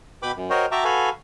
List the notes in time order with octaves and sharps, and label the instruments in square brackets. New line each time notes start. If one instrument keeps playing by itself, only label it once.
[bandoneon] B2 B4 G5 B5 D6
F#2
F#4 A#4 C5 C#5 D#5 G5
F#4 E5 G5 A5 A#5 D6
F#4 A4 B4 F5 G#5